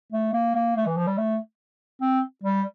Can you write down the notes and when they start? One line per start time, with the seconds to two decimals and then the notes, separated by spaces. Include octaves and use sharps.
0.12 A3
0.33 A#3
0.55 A#3
0.76 A3
0.86 E3
0.97 F3
1.07 G3
1.18 A3
2.01 C4
2.43 G3